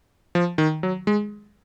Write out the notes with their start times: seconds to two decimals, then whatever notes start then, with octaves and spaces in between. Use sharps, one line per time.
0.35 F3
0.58 D#3
0.83 F#3
1.07 G#3